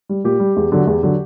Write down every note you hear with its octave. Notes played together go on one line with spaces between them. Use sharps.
G3
A#2 G4
G3
E2
D3 F#3
E2
D3 F#3